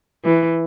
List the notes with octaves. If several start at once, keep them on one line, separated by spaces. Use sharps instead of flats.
E3